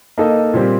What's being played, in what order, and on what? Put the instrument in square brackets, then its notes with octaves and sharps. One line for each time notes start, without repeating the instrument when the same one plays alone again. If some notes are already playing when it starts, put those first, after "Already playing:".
[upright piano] A#3 D#4 A4 D#5
A#2 G3 C4 G4